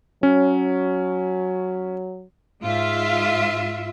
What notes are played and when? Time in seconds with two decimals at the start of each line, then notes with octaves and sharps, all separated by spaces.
0.23 F#3 C#4
2.62 G#2 F4 E5